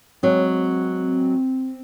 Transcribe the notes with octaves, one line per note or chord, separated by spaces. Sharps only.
F#3 G#3 C4